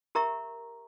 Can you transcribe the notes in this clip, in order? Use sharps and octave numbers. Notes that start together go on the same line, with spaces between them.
G4 A#4 E5 A#5 C#6